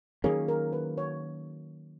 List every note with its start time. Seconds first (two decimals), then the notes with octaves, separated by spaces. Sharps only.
0.24 D#3 F#3 A#3 C#4 G#4
0.48 A#4
0.73 B4
0.98 C#5